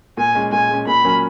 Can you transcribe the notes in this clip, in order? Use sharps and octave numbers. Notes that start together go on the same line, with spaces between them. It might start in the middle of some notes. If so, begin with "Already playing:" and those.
A#2 G#5
G#3 C#4
A#2 G#5
G#3 C#4
A#2 B5
F#3 A#3 C#4